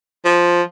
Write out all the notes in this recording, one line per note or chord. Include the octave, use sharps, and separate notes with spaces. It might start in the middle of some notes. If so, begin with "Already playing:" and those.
F3